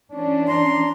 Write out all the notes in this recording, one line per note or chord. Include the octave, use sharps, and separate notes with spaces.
E3 C#4 D4
A#5 C6